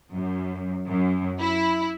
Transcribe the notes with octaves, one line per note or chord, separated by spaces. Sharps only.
F#2
F#2
E4